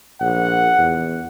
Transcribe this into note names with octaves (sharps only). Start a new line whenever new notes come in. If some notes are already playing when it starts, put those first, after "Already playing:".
A#1 F#5
E2